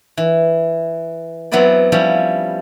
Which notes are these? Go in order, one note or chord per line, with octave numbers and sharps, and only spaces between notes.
E3
F#3 B3 C4 E4 B4 D5
F3 G3 C#4 E4